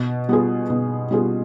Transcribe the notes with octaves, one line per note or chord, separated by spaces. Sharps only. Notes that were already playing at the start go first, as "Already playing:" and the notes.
Already playing: B2
G3 B3 F4 G#4
B2
G3 B3 F4 G#4